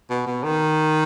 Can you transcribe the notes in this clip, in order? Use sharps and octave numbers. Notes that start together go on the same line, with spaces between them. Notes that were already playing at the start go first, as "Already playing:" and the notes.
B2
B2
D#3